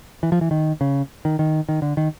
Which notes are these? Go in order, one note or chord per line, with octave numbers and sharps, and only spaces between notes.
E3
F3
E3
D#3
C#3
D#3
D#3
D#3
D3
D#3